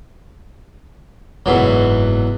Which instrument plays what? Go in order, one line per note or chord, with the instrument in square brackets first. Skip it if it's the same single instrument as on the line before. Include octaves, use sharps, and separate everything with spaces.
[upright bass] F#1 G#2 [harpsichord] E2 B2 F#3